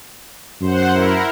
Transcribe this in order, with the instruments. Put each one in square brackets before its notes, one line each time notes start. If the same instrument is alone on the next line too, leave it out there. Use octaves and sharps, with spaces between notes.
[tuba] F#2 [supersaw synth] C5 F#5
[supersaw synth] E4 A#4